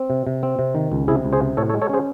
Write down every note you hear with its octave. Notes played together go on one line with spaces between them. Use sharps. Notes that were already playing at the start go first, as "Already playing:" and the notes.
Already playing: C4
C3
C3
C4
C3
D#3
C#2
C3 E4 G#4
C#2
G#4 C5
C3
A2 A4 C#5
A4 C#5
G#3
A4 C#5
C#4 G#4 C5